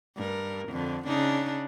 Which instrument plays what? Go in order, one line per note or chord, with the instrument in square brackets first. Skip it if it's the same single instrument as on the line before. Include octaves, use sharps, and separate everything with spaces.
[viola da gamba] G2 A#4
F2 D3
C#3 D4 D#4